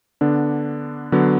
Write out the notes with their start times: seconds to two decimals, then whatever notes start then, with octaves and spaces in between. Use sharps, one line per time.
0.21 D3 B3 D4
1.12 D3 F#3 B3